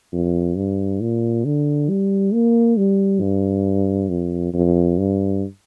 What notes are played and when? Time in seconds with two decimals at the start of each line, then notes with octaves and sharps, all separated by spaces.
0.13 F2
0.57 G2
1.01 A#2
1.45 D3
1.89 G3
2.33 A#3
2.77 G3
3.21 G2
4.09 F2
4.53 F2
4.98 G2